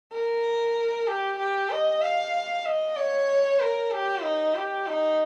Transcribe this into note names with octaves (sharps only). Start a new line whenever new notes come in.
A#4
G4
G4
D#5
F5
D#5
C#5
A#4
G4
D#4
G4
D#4